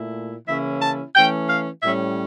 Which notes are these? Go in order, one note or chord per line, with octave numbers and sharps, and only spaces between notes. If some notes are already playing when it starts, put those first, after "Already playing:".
Already playing: A#2 A3 E4
C#3 E3 A#3 C#4 E4 E5
A5
E3 A3 C#4 G5
F5
A2 G3 C#4 E5